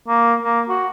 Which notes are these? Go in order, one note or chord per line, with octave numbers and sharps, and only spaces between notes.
A#3
A#3
F#4